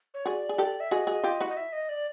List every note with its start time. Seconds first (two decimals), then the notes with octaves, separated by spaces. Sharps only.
0.14 C#5
0.26 F#4 G#4 D5
0.49 G#4
0.58 G4 A4
0.80 E5
0.91 F#4 G#4 D#5
1.07 F#4 G#4
1.23 F4 G4
1.40 E4 F#4
1.49 D#5
1.57 E5
1.73 D#5
1.89 D5